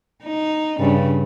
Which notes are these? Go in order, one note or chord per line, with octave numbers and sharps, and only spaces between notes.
D#4
G2 C#3